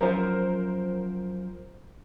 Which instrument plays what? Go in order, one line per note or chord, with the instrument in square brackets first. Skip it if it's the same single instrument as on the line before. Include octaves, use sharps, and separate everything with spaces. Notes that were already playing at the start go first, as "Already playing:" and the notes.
[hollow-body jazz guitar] F#2 F3 [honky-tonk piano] A#4 C5